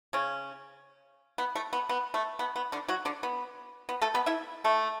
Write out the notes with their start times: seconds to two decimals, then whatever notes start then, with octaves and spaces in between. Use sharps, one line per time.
0.13 C#3 C#4
1.38 B3
1.55 A3
1.73 B3
1.89 B3
2.14 A3
2.39 B3
2.56 B3
2.72 D3 D4
2.88 F#3 F#4
3.05 D3 D4
3.23 B3
3.89 B3
4.02 A3 A4
4.14 B3 B4
4.26 E4 E5
4.64 A3 A4